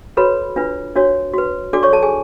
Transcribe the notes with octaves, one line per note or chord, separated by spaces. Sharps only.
F#4 A4 B4 C#5 B5
D4 F4 B4
D4 F#4 C#5
F#4 B4
D4 F#4 A4 D5 D6
C#5 C#6
A4 A5
G#4 G#5